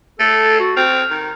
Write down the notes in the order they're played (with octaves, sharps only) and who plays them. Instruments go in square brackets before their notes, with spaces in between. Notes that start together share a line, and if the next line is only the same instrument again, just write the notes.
[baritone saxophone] A3 [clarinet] A4
[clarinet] F#4
[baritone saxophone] C4 [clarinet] F6
[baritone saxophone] D#3